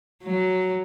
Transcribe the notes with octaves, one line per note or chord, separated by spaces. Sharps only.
F#3